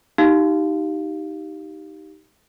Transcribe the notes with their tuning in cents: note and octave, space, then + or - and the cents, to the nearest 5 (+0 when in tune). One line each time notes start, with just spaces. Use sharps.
D#4 +5 G4 -10 F5 +0